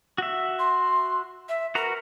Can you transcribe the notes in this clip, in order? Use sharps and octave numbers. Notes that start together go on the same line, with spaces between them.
F#4 E5
C6
E5
F#4 A#4 B4 A#5